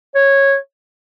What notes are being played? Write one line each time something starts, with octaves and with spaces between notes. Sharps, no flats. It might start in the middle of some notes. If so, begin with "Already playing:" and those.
C#5